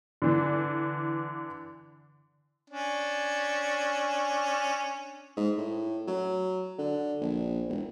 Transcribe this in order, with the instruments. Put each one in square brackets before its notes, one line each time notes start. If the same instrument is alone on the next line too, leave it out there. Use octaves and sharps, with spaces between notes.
[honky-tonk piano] D3 E3
[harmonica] C#4 D4
[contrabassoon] G#2
A2
F#3
D3
A#1
E1